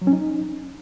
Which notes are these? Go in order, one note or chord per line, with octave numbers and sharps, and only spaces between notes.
F#3
C#4
D#4